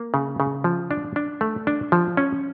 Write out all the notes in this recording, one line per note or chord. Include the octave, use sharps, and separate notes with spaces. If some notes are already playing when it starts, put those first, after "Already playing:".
Already playing: A#3
C#3
C#3
F3
D4
D4
A3
D4
F3
C#4